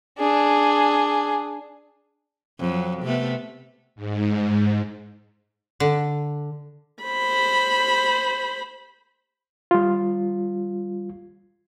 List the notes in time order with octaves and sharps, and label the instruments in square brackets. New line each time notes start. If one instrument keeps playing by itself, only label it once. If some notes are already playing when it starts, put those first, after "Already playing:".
[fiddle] D4 G#4
[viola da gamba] F2 F#3
C3 A3 B3
[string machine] G#2
[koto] D3
[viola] C5 B5
[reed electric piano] G3 F4